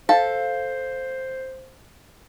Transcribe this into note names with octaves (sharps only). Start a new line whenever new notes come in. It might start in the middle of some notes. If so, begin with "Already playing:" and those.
A4 C5 F5